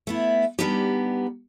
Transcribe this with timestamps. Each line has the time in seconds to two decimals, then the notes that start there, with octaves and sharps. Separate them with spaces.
0.07 A3 B3 E4
0.59 G3 B3 D4 D#4 G4